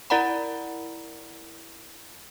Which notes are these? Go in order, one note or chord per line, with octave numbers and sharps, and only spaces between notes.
E4 A#4 D5 F#5 A#5 B5